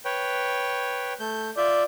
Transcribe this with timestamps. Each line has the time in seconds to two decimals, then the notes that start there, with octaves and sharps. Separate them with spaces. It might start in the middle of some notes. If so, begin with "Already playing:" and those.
0.05 B4 C#5 G5
1.20 A3 G6
1.57 F4 D5 E5 G6